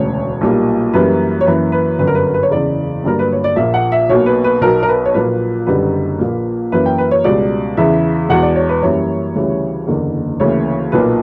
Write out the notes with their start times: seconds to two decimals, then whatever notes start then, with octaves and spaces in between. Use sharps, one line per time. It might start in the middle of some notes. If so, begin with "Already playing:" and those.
Already playing: E1 D2 C#3 C#5
0.41 B1 A#2 G3 A#3
0.93 F#2 E3 G3 A#3 B4
1.41 C#5
1.46 F#2 E3 A#3 B4
1.72 B4
1.98 G1 F#2 D3 F#3 B4
2.07 A#4
2.15 B4
2.26 A#4
2.34 B4
2.43 C#5
2.51 F#1 E2 C#3 D5
3.04 G1 G2 F#3 A#3 A#4
3.19 B4
3.32 C#5
3.44 D5
3.56 A#1 A#2 A#3 E5
3.74 F#5
3.92 E5
4.09 B1 B2 A#3 C#5
4.26 B4
4.44 B4
4.61 B1 B2 F#3 A#4
4.83 A#4
4.89 B4
5.05 C#5
5.14 A#1 A#2 F#3 A#3 B4
5.67 F#1 F#2 D3 G3 B4
6.19 A#1 A#2 A#3
6.72 F#2 E3 A#3 B4
6.86 G5
6.98 B4
7.11 C#5
7.24 C#2 B2 G3 D5
7.77 E2 C#3 E3 E5
8.29 E1 E2 B2 F#5
8.43 D5
8.55 C#5
8.69 B4
8.82 F#2 E3 G3 A#3 C#5
9.35 D2 C#3 E3 G3
9.87 F#1 E2 D3 A#3
10.40 D2 C#3 E3 A#3 C#5
10.92 B1 A#2 A#3 B4